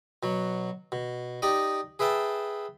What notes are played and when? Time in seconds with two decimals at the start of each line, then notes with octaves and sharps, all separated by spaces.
0.23 B2 F#3
0.92 B2
1.42 D#4 G4 D5 D#5
1.99 G#4 B4 E5 G5 A5